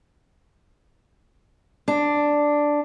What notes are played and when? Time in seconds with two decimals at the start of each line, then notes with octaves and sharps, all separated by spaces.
1.88 D4